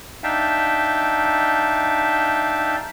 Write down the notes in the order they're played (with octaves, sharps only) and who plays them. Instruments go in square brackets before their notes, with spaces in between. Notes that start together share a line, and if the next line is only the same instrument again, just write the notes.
[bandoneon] D4 D#4 E5 F5 G5 A5